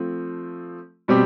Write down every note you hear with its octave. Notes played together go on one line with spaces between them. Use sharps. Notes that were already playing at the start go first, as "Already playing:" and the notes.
Already playing: F3 A3 C4
B2 G3 C4 G4